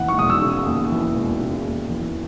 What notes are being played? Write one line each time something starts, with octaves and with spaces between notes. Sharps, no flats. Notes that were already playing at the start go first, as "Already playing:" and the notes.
Already playing: E1 D#2 C#3 E3 F#5
C#6
E1 D#6
E6
C#3
D#2
E3
E1
C#3
D#2
E3